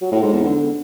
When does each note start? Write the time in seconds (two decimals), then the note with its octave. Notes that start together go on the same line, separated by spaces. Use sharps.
0.01 F#3
0.12 A2
0.22 G#2
0.33 E2
0.43 D3